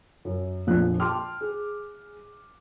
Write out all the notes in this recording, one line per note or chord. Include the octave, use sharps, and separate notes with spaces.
F#2
A#1 F2 A#2 F3 D4 F#6
G5 A5 C6 D6 F6
G#4